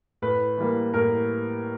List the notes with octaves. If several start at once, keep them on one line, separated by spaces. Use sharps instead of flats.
A2 B4
E3 G3 A#3
A2 A#4